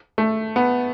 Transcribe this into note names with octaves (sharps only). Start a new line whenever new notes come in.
A3
B3